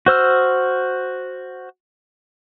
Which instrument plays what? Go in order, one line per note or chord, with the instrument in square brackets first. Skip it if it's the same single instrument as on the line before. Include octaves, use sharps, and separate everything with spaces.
[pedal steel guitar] F#4 C5 E6 F6